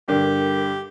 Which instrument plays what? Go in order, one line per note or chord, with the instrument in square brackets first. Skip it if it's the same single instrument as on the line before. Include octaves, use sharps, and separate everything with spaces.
[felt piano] G2 D3 [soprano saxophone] G4 [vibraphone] A#4